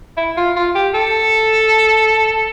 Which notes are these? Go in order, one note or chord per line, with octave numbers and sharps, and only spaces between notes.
E4
F4
F4
G4
A4